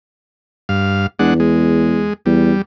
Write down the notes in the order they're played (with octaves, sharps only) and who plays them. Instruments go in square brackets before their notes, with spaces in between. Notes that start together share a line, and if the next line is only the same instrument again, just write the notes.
[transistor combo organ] G2 F5
[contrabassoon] E2 [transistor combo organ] G#3 D4 F#5
[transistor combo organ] G#3
[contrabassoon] E2 [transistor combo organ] G3